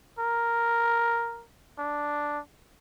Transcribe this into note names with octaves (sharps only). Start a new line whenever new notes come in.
A#4
D4